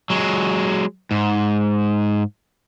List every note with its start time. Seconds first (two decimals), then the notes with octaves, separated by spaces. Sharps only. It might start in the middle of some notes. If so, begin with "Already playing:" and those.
0.10 F#3 G#3
1.11 G#2